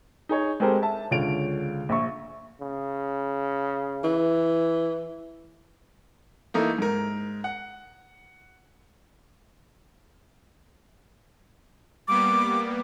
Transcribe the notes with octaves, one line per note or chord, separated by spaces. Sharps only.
D#4 G#4 C#5
G#3 C4 G4 A4 A#4 C5
E5 A5
C#2 D3 F4 C#5 D7 F7
A#1 E5 C#6
C#3
E3
E3 A3 A#3 D#4
G#2 A#4
F#5
G3 A#3 B3 D6